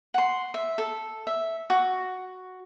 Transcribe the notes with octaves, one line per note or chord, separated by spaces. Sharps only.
F#5 C6
E5
A4
E5
F#4